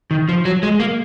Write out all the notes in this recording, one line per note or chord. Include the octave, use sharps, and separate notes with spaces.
D#3
F3
F#3
G#3
A#3